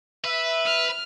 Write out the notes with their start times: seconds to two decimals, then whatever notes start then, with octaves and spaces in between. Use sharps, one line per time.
0.24 B4 E5
0.66 F6